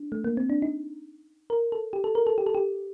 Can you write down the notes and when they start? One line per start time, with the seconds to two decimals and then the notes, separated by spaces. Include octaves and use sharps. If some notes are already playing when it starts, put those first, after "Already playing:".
Already playing: D4
0.12 A3
0.24 A#3
0.37 C4
0.50 D4
0.62 D#4
1.50 A#4
1.72 A4
1.93 G4
2.04 A4
2.15 A#4
2.27 A4
2.38 G4
2.47 A4
2.55 G4